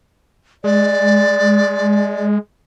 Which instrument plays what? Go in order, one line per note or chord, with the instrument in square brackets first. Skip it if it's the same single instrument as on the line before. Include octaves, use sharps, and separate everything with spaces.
[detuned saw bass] G#3 [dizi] D5